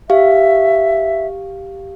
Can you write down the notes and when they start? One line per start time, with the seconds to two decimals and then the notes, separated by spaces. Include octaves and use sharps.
0.10 G4 E5 F5